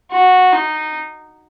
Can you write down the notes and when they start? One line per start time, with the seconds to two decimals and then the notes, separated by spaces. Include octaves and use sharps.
0.11 F#4
0.52 D#4